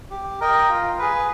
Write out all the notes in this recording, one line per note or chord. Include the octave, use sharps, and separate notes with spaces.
G4
A#4 D#5 G5
F4
G#4 B4